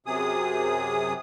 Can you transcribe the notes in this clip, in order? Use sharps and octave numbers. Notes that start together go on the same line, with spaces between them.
F#2 C3 G#4 D#6